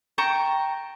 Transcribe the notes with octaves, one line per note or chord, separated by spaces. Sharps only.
G5 A5 A#5 C#6